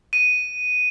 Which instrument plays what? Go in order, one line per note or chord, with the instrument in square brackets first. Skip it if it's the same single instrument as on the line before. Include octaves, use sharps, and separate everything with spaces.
[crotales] D#7